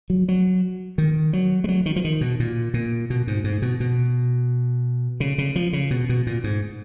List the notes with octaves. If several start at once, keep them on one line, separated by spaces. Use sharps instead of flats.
F#3
F#3
D#3
F#3
G#3
F#3
D#3
F3
D#3
B2
A#2
A#2
B2
G#2
G#2
B2
B2
C#3
C#3
F3
C#3
B2
B2
A#2
G#2